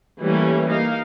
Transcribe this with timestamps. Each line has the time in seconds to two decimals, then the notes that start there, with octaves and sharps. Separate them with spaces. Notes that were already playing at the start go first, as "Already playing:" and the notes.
0.21 E3 G3 A3 A#3 C#4
0.69 A#3 D#4 F5